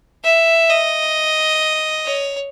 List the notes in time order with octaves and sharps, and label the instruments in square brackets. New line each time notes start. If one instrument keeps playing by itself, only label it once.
[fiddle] E5
D#5
C#5